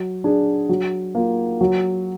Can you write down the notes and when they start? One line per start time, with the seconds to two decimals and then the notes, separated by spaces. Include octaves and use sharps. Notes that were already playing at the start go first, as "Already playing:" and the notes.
Already playing: F#3
0.24 D4 G#4
0.69 F#3
1.15 A#3 F4
1.61 F#3